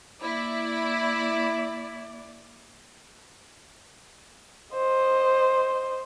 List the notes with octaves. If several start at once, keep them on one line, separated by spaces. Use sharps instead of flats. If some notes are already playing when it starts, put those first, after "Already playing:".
A#3 E4 D5
C5 D#5